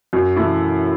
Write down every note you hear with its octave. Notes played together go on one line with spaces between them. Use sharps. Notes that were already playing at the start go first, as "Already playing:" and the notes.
F#2
E3 A3 E4